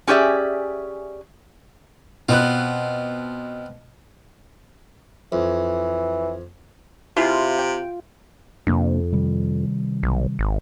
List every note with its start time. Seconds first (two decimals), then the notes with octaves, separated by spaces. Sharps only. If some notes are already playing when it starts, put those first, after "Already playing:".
0.07 C#4 G4 G#4 D5 E5
2.29 B2 B3 C4 F4 F#6
5.32 F2 E3
7.17 C3 E4 F4 G#4
7.59 G5
8.67 F2 C3 A#3 D4
9.12 C3 D#3 G3
10.03 B1
10.39 G#1